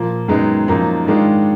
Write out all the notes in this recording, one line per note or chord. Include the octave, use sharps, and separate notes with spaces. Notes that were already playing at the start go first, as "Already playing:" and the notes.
Already playing: A#2 F3 A#3
F#2 D#3 G#3 B3 D#4
F#2 F3 A#3 D#4
G#2 D#3 G#3 D4 F4